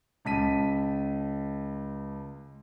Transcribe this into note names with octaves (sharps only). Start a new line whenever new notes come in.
C#2 A5 B6 D#7